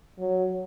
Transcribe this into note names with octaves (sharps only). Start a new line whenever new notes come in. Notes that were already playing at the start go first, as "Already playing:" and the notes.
F#3